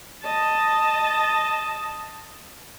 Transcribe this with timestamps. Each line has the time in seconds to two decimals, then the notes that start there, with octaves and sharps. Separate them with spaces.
0.24 D#5 A5